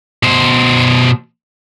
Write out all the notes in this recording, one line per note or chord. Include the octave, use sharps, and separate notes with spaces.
B2 C5